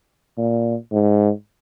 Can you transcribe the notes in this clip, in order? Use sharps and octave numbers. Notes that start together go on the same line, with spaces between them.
A#2
G#2